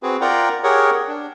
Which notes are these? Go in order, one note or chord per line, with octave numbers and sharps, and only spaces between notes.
C4 F#4 G#4 B4
F4 A#4 D5 F#5 G5 A#5
G4 G#4 A#4 C#5 F#5
D4